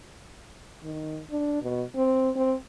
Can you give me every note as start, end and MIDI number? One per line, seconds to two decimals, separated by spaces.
0.83 1.22 51
1.31 1.58 62
1.63 1.83 47
1.96 2.30 60
2.36 2.54 60